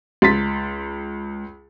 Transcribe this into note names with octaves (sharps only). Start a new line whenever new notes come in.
C#2 C6 A6 B6